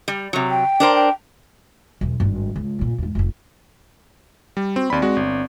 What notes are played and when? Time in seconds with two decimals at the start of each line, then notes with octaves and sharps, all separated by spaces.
0.08 G3
0.33 C3 F#3
0.50 G5
0.80 D4 A#4 C5
0.95 G5
2.01 B1 E2
2.20 G#1 G2
2.56 C#2
2.79 D#2 A#2
2.98 E2 G#2
3.15 F1 F2
4.57 G3
4.76 C4 F#4
4.90 D#2 C4 D5 B5
5.02 G#3 F#4
5.16 G1